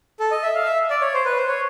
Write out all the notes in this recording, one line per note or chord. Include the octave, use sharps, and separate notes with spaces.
A4
D#5
E5
F5
E5
D5
C#5
C5
B4
C5
C#5